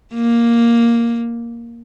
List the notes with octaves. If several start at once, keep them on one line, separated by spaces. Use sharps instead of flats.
A#3